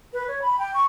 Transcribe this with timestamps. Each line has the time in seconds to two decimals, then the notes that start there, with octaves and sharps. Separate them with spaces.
0.13 B4
0.28 C#5
0.42 B5
0.59 G5
0.74 C#6